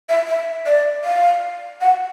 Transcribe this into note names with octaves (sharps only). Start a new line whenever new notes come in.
E5
E5
D5
F5
F#5